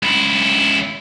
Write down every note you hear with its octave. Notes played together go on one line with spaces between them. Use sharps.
C#2 E4